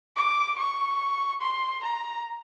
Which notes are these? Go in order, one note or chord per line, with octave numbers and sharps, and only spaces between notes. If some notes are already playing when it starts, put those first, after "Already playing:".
D6
C#6
C6
A#5